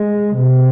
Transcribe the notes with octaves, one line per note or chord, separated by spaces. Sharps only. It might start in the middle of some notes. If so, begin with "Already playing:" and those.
Already playing: G#3
C3